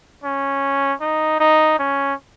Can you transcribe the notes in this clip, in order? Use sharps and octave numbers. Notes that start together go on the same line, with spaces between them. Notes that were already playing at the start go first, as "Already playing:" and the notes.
C#4
D#4
D#4
C#4